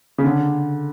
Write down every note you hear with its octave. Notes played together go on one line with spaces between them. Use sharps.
C#3
D3